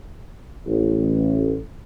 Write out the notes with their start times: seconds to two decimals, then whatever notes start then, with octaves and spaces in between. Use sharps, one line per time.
0.67 A1